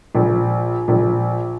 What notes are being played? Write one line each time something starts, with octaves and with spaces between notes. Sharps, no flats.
A#1
A#1